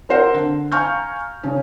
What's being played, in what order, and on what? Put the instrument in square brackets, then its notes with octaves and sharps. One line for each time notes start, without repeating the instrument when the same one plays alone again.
[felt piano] C4 A#4 C5 F#5
D3
F5 G#5 A#5 C#6 F6 G6
C#3 C#4